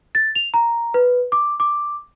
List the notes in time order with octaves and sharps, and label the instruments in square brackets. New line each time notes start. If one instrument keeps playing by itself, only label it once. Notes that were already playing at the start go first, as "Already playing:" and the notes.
[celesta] A6
F7
A#5
B4
D6
D6